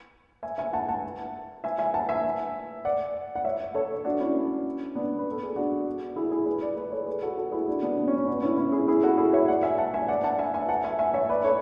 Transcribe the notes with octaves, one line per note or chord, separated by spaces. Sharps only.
E5 G#5
E5 G#5
F#5 A5
F#5 A5
E5 G#5
E5 G#5
F#5 A5
E5 G#5
D5 F#5
F#5
C#5 E5
A4 C#5
D4 F#4
C#4 E4
B3 D4
B4
A4
G#4
D4 F#4
E4 G#4
E4 G#4
G#4 B4
B4 D5
B4 D5
A4 C#5
G#4 B4
F#4 A4
F#4 A4
E4 G#4
D4 F#4
B3 D4
B3 D4
C#4
C#4
B3 D4
C#4 E4
C#4 E4
E4 G#4
E4 G#4
F#4 A4
E4 G#4
C#5 E5
D5 F#5
E5 G#5
F#5 A5
E5 G#5
D5 F#5
F#5 A5
E5 G#5
E5 G#5
F#5 A5
E5 G#5
E5 G#5
C#5 E5
B4 D5
A4 C#5